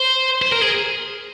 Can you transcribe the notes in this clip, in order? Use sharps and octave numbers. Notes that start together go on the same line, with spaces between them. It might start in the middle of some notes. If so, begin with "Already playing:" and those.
Already playing: C5
C5
A#4
G#4